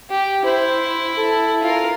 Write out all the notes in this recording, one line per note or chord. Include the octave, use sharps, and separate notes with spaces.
G4
E4 C5
A4
F4 A#4